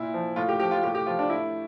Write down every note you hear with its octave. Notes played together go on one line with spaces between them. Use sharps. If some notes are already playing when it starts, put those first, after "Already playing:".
Already playing: A#2 E4
F3
A2 F4
G4
F3 G4
F4
A2 G4
G4
F3 F4
D4
A2 E4